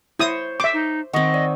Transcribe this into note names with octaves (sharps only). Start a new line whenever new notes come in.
E4 C5 C#5 D#6 G6
C5 E5 D6
D#4
D#3 C4 D#5 F#5 C#6 D#6
D5